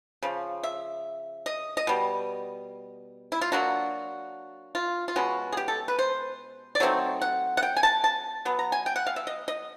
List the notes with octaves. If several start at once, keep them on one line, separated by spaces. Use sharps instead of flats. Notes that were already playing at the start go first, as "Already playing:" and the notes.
C#3 F3
E5
D#5
D#5
B2 G3
E4
F4
F#3 A#3 D4 F#4
F4
F4
B2 G#3 C#4 F#4
G#4
G4
A4
B4
C5
D5
F#3 A3 C4 D#4 C#5
F#5
F#5
G5
G#5
A5
A5
F#3 B3
A#5
G#5
G5
F#5
F5
E5
D#5
D#5